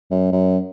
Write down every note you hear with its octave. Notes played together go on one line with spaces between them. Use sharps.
F#2
F#2